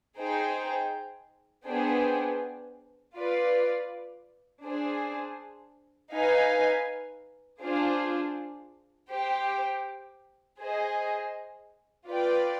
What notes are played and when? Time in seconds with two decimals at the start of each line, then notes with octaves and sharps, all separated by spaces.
0.19 D#4 G#4 C5 G5
1.67 B3 D4 G#4 C5 G5
3.16 F4 B4 D5
4.64 D4 G#4 C5
6.13 D#4 B4 F5 G#5
7.61 D4 F4 G#4 C5
9.10 G4 C5 G5
10.59 G#4 C5 D#5
12.08 F4 B4 D5 G5